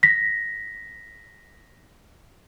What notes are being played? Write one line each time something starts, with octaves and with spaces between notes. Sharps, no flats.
A#6 B6